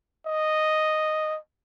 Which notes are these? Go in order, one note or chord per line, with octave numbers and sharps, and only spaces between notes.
D#5